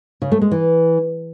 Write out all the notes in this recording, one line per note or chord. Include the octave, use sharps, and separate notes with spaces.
C#3
A3
G#3
E3